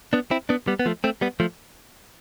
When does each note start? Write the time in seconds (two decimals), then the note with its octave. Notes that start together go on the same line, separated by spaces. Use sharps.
0.13 B3 D4
0.31 C4 E4
0.49 B3 D4
0.68 G3 B3
0.79 B3
0.86 F3 A3
1.04 A3 C4
1.21 G3 B3
1.40 F3 A3